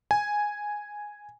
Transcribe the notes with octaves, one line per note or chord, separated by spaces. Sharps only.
G#5